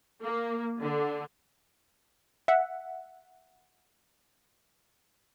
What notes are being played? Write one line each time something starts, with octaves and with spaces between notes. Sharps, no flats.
A#3
D3
E5 F#5